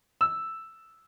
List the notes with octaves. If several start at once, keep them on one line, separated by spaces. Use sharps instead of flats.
E6